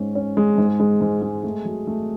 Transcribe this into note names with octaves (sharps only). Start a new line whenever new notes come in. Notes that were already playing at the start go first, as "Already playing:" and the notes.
Already playing: G#2 C#4
C#4
G#3
G#2
G#3
G#2
G#3
A3
F#3
A3